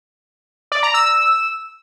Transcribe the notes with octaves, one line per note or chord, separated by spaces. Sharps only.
D5
A#5
E6